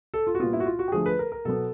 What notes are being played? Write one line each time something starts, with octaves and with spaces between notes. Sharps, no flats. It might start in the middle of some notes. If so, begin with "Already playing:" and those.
A4
F4
F#4
A#2 G3 B3 F4
E4
F#4
F4
F#4
G4
D3 F3 A3 G#4
B4
A#4
A#4
B2 F#3 B3 A4